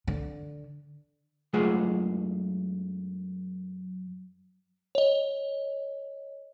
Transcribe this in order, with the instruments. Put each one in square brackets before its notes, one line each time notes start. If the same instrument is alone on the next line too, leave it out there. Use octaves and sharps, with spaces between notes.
[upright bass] D3
[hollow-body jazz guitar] F#2 G#3 A3 F4 G#4 F#5
[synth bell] C#5 D#5